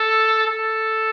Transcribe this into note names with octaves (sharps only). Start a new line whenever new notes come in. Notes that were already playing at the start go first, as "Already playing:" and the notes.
Already playing: A4
A4